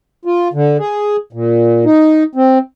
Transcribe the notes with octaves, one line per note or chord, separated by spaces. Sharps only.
F4
D3
G#4
A#2
D#4
C4